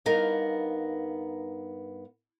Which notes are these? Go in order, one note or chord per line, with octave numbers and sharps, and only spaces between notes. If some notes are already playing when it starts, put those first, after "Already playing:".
G2 B3 D#4 A#4 F5